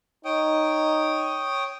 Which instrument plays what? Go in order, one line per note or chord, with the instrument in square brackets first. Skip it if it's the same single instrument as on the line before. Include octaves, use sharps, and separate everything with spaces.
[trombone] D#4 [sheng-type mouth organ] C#5 G5 D#6